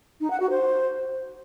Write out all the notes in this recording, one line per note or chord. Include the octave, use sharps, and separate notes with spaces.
D#4
F#5
F#4
C5